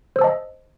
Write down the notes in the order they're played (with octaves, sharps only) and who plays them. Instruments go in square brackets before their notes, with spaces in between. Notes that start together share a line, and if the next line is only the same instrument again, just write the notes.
[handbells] C5
E6
A5
D#5